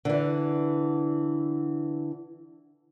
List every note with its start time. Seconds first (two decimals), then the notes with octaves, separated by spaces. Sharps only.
0.05 D3 E3